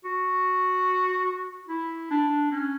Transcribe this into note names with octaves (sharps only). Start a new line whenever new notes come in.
F#4
E4
D4
C#4